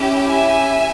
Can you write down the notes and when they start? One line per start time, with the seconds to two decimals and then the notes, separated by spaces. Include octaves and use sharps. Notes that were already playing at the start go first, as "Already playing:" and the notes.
Already playing: C#4 E4 G4
0.29 E5 G#5